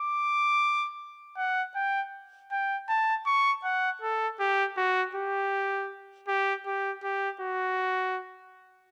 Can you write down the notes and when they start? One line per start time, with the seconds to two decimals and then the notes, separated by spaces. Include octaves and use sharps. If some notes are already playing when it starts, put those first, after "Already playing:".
Already playing: D6
1.37 F#5
1.75 G5
2.51 G5
2.89 A5
3.26 C#6
3.64 F#5
4.02 A4
4.40 G4
4.77 F#4
5.15 G4
6.28 G4
6.66 G4
7.03 G4
7.41 F#4